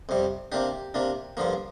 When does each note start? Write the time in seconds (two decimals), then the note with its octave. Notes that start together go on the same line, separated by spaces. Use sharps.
0.09 F2 C3 G3
0.52 C3 A#3 D4 G4
0.94 C3 A#3 D4
1.37 G2 D3 F3 A#3